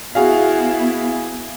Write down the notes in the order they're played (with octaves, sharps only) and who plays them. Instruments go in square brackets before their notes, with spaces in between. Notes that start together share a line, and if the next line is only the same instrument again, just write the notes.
[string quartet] B3 E4 [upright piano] F#4 G#4 F5